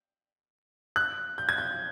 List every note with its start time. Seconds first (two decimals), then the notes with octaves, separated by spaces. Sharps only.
0.96 F#6
1.38 G6
1.49 G#6
1.58 G6